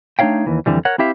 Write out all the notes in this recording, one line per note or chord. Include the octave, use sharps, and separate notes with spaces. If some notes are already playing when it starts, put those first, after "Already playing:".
A3 D4 D#4 C#5 F5 G5
D#2 E3
F2 G#2 D3 E3 G3
A#4 C#5 F#5
C4 E4 G4 E5 F5